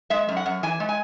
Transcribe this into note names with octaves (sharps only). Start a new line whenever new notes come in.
G#3 E5
F#2
F#5
F#2
E3 G#5
G#3
G#5